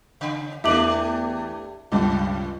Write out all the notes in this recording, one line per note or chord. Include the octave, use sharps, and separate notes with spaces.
C#3
E2 A3 D4 G4 E5 D6 F#7
C#2 G2 C3